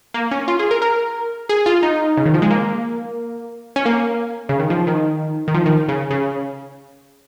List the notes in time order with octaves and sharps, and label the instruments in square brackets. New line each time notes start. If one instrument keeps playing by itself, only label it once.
[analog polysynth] A#3
C#4
F4
G#4
A#4
A#4
G#4
F4
D#4
C#3
D#3
F3
G#3
A#3
C#4
A#3
C#3
D#3
F3
D#3
D#3
F3
D#3
C#3
C#3